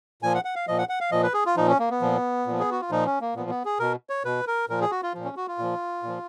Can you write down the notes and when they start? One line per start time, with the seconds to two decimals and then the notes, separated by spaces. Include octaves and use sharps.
0.22 A#2 F3 G#5
0.34 F#5
0.45 F#5
0.56 F5
0.68 A#2 F3 D#5
0.79 F#5
0.89 F#5
1.00 F5
1.11 A#2 F3 D#5
1.23 B4
1.34 G#4
1.46 F4
1.56 A#2 F3 D#4
1.68 C#4
1.79 A#3
1.90 B3
2.01 A#2 F3
2.47 A#2 F3
2.60 G#4
2.71 F#4
2.81 F4
2.91 A#2 F3 D#4
3.06 C#4
3.21 A#3
3.35 A#2 F3 B3
3.50 B3
3.65 G#4
3.79 B2 A#4
4.10 C#5
4.25 B2 B4
4.47 A#4
4.69 A#2 F3 A#4
4.81 G#4
4.91 F#4
5.03 F4
5.14 A#2 F3
5.24 C#4
5.37 F#4
5.48 F4
5.59 A#2 F3
6.03 A#2 F3